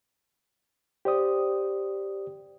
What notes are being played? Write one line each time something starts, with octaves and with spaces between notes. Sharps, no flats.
G4 C5 D5 D#6